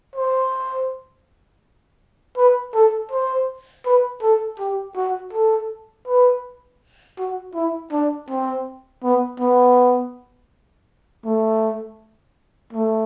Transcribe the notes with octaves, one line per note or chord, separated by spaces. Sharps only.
C5
B4
A4
C5
B4
A4
G4
F#4
A4
B4
F#4
E4
D4
C4
B3
B3
A3
A3